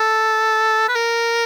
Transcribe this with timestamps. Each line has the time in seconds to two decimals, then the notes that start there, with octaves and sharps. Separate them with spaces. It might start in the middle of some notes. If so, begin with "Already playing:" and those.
Already playing: A4
0.88 B4
0.95 A#4